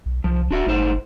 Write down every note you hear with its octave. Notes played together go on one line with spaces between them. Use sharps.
B1
C2 F3
D1 D4 F#4 E5
G1 A2 D#4 C5